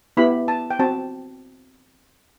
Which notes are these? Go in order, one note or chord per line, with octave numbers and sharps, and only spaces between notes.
B3 E4 G4 B5
A5
G5
C4 F#4 A5